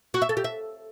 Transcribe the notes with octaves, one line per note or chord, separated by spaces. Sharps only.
F#4
E5
A4
G4
E5